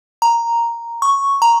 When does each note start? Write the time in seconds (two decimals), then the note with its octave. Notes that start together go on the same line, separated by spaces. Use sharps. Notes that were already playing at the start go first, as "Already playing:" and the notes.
0.22 A#5
1.02 C#6
1.42 A#5